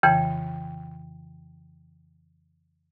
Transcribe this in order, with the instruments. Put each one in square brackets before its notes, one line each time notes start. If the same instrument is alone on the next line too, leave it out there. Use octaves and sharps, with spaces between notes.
[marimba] F2 C#3 E3 [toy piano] G5